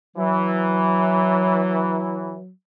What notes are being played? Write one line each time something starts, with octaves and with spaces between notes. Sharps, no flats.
E3 F#3